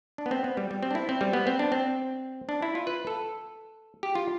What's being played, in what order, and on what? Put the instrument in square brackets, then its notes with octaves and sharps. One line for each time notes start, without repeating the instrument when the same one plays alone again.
[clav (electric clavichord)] D4
B3
C4
B3
G3
G3
C4
D4
E4
C4
G3
B3
C4
D4
C4
D4
E4
F4
B4
A4
G4
F4